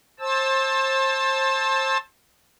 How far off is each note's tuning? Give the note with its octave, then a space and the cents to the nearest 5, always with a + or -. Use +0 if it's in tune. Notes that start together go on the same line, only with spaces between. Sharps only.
C5 +30 A5 +0 E6 -10